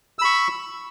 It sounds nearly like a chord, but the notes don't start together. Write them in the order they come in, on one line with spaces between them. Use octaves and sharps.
E6 B5 C#6